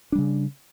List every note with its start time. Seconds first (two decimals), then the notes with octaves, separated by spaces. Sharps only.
0.12 D4
0.15 G3
0.18 C#3